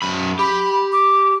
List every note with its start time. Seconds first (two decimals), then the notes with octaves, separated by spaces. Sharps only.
0.02 F#2 B5
0.39 G4 B5
0.92 D6